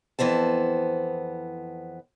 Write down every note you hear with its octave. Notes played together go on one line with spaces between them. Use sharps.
F2 E3 B3 C5 A5